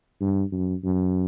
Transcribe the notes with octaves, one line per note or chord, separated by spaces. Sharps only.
G2
F#2
F#2